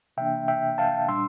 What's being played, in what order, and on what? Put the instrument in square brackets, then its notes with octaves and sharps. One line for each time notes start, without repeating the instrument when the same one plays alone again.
[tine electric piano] C3 E3 A#3 D4 E5 G5
E5 G5
F5 A5
A#2 G3 D4 C6 E6